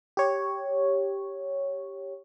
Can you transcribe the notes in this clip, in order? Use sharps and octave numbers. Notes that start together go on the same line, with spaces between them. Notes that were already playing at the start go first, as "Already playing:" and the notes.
G4 C#5